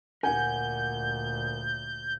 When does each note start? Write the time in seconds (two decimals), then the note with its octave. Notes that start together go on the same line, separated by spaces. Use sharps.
0.23 D2 A#2 A#4 F#5 G#5 G6